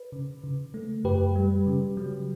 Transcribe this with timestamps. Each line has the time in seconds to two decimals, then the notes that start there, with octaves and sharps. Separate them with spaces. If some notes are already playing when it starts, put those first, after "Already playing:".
Already playing: B4
0.12 C#3
0.44 C#3
0.74 A3
1.04 F#2 G4 B4
1.35 G3
1.66 C#3
1.97 F#3